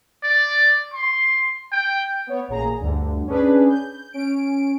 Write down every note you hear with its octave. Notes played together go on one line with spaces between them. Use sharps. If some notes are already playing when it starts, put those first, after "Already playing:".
D5
C6
G5
B3 C#5
A1 A#2 G#4 A#5
D2 G2 D3
C#4 D4 G#4 B4
G6
C#4 D7